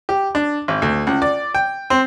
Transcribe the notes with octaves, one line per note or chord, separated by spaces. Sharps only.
G4
D4
G#1
D2
C#2
D5
G5
C4